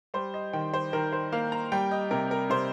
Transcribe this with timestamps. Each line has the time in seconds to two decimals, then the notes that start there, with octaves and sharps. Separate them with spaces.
0.14 G3 C5
0.34 D#5
0.53 D#3 G5
0.74 C5
0.93 D#3 A#4
1.13 C5
1.32 A#3 F5
1.52 A#5
1.72 G3 G5
1.91 D#5
2.11 C3 A#4
2.31 A#4
2.50 C3 C5